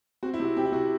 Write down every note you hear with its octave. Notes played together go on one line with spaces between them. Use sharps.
C4 F#4
E4
C3 F#4
C3 G4
E4
C3 F#4